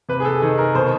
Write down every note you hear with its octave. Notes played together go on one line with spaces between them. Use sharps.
C3 B4
G#4
A4
D#3 G#4
A#4
B2 C5